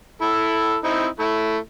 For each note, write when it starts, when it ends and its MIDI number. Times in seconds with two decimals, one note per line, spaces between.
0.22 0.76 64
0.22 0.76 69
0.84 1.07 60
0.84 1.07 63
0.84 1.07 64
1.19 1.57 57
1.19 1.57 64